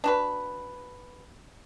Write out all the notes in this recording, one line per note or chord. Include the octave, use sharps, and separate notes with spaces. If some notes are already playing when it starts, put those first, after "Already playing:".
D4 F#4 B4